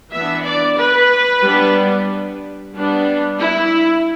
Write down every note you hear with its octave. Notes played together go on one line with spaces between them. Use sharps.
E3 B3 D4 E5
D5
B4
G3 B3 D4
G3 B3 D4
E4